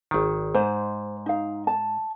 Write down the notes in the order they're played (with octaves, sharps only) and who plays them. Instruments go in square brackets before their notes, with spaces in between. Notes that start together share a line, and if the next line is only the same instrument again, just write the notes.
[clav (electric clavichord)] G#1 D#3
[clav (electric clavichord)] G#2 [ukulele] C5
[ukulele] D#4 F5
A5